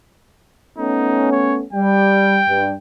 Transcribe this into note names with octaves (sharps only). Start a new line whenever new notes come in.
A3 B3 C#4 D#4
C#5
G3 G5
G2